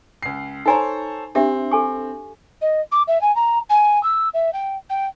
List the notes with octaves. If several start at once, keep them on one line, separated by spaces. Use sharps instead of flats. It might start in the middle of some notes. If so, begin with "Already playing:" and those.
C#2 C7
D#4 A4 C5 C#5 G#5 A#5
C4 D4 G4 E5
A4 G#5 C#6
D#5
D6
E5
G#5
A#5
G#5
E6
E5
G5
G5